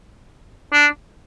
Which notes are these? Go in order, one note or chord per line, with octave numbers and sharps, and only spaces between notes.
D4